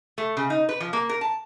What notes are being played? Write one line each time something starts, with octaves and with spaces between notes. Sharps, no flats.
A3
C#3
D#4
B4
F3
A#3
A#4
A5